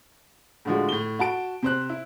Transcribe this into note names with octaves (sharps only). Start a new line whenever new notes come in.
A2 D3 F3 G#3 F#4
A2 G7
F#4 A5 D7
C3 C5 F#6
E4